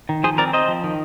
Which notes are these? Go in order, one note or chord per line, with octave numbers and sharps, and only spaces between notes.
D#3
F3 G#4 C5
C4 A#4 D5
C4 C5 D#5
F3
D#3